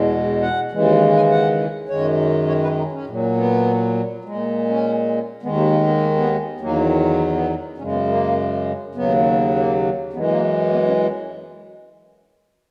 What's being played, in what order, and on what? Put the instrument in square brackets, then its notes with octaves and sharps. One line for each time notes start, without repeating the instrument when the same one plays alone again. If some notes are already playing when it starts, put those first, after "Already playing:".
Already playing: [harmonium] E2 B2 G#3
F#5
D#2 C#3 E3 G#3
G#5
F#5
F#2 D#3 G#3 C#5
C#5
B4
D#4
C#4
A#2 F#3
B3
A#2 G#3
C#4
D#2 D#3 G#3 B3
A#3
A#3
B3
A#3
B3
E2 D#3 F#3 A#3
B3
B3
F#2 C#3 G#3 C#4
B3
A#3
D#2 C#3 F#3 B3
A#3
F#2 E3 G#3 B3
A#3
B3
C#4